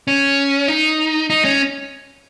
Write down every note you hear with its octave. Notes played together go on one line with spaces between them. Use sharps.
C#4
D#4
D#4
C#4